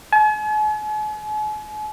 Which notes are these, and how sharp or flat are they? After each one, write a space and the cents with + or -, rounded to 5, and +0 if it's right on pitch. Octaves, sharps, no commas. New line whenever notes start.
G#5 +45